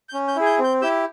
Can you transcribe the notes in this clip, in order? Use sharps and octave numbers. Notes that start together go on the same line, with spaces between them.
G6
C#4
G6
E4 G#4
G6
C4
G6
E4 G4 E6 G6